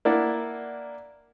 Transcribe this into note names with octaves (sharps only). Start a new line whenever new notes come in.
A#3 D4 E4 D5 F#5